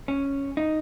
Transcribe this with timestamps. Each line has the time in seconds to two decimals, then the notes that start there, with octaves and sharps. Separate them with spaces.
0.08 C#4
0.57 D#4